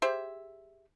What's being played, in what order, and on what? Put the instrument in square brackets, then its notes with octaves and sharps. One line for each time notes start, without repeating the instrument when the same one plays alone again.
[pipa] G4 G#4 C5 E5